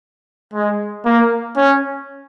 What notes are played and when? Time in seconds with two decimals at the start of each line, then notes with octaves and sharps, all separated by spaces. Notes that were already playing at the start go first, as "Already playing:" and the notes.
0.54 G#3
1.05 A#3
1.56 C#4